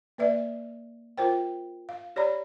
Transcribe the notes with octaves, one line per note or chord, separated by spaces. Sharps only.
A#3 B4 D5 E5
F4 A#4 C5 G5
F5
G4 C#5 D5 A#5 B5